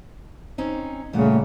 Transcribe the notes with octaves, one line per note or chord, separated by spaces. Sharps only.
C4 C#4 D#4
A#2 C#3 G3 A3 F#5